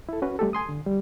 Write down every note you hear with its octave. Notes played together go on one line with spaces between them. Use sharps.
E4 A4
C#4 F#4 B4
G3 A3 G4 A4
G#5 C6 D#6
D3
G3